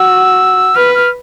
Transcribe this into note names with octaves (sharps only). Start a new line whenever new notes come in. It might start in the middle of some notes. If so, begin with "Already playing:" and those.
Already playing: F#4 E6
B4 F6
F6